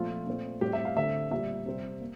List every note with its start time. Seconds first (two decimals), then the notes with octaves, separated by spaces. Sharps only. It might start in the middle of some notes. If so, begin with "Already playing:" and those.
Already playing: A#2 F3 A3 C4 F4
0.27 A#2 A3 C4
0.61 A2 G3 C4 G4
0.73 E5
0.85 F5
0.96 D3 A3 C4 E5
1.31 A#2 G3 C4 E5
1.66 C3 G3 C4
2.01 A#3